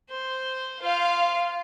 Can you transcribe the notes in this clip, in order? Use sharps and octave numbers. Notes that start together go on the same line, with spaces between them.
C5
F4 F5